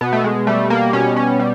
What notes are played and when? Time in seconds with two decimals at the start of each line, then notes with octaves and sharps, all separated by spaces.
0.01 B2 B3
0.13 A3
0.24 G#3
0.47 G3 A3
0.70 A#3
0.93 B2 C#4
1.16 C#4
1.39 G3